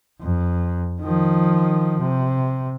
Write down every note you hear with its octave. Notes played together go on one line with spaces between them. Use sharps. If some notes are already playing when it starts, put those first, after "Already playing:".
F2
D#3 F3
C3